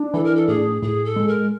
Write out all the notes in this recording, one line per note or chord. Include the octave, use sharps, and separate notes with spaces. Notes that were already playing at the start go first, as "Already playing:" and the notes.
Already playing: D4
E3 A4
A#4
A4
A2 G#4
A2 G#4
A4
G#3
A#4